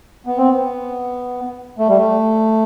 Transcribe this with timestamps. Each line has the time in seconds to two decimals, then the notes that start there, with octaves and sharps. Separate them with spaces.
0.27 B3
0.38 C4
0.51 B3
1.78 A3
1.88 G3
1.97 A3